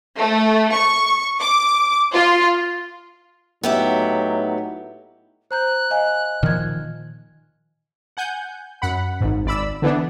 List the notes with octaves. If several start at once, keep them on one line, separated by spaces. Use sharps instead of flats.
A3
C#6
D6
F4
A2 F#3 B3 D#4 G4 E5
C5 A#5 F#6 G6
D#5 F5 G#5
A#2 D#3 F3 F6 G#6
F#5 G#5 G6
F#2 F#5 B5
G#1 G#2
G#1 D5 B5 E6
D3 E3 B3 D4